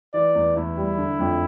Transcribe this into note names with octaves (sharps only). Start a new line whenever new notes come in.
E3 D5
E2
E2 E4
G3
D3
F2